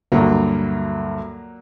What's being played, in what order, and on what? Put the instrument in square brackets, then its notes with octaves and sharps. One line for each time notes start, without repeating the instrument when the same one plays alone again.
[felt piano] D2 G2 [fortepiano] A#2 F#3 A#3